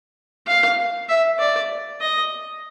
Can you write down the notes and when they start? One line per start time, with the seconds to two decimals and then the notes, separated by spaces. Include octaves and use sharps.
0.47 F5
1.09 E5
1.39 D5
2.01 D#5